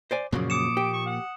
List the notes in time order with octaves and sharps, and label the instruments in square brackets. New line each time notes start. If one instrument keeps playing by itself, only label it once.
[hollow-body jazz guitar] C5 D5 G#5
[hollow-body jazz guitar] F#2 C#3 [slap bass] A#2 F3 A#3
[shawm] D6 [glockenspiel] D#6 C#7 E7
[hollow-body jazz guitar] G4
[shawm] C#6
F#5